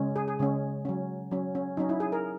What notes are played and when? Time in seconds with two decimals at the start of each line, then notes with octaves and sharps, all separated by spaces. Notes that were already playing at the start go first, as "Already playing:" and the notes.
Already playing: C#3 G#3 C#4
0.16 G#4
0.28 G#4
0.39 C#3 G#3 C#4
0.85 F#3 C#4
1.31 F#3 C#4
1.55 C#4
1.77 F#3 C#4 D#4
1.89 E4
2.00 G#4
2.12 A#4